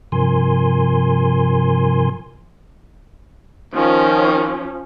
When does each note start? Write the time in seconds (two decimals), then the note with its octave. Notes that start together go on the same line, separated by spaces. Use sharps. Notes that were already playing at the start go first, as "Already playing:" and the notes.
0.12 G2 C3 F3 A#4 G#5 C6
3.74 D#3 F3 C#4